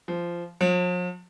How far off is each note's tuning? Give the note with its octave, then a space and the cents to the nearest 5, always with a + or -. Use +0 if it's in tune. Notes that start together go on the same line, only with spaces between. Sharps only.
F3 -15
F3 +45